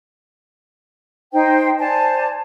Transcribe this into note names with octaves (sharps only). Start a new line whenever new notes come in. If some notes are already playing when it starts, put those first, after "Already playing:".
D#4 C5 G5
C5 D5 G#5 A5